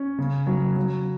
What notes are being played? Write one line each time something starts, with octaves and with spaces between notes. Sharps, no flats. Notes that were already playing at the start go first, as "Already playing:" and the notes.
Already playing: C#4
C#3
F#3
F#3